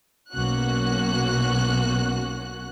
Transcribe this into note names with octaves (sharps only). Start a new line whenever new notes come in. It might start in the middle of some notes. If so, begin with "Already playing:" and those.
B1 A#3 C#4 F#4 F#6